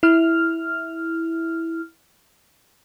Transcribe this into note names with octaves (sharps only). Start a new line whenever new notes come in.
E4 F6